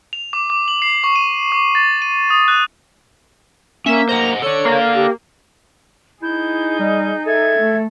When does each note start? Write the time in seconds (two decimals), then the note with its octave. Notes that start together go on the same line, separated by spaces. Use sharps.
0.13 F7
0.33 D6
0.50 D6
0.68 F#7
0.82 C7
1.04 C#6
1.16 D#7
1.52 D6
1.75 A6
2.02 D#7
2.30 D#6
2.48 F#6
3.86 A#3 C#4 E5
4.09 C5 D#5 F#5 A#5
4.42 A4 C#5 D5 C#7
4.65 A#3
4.95 G4
6.22 D#4 E4 G#4 G6
6.79 G3 D#5
7.26 A4 E5 G#6
7.59 A3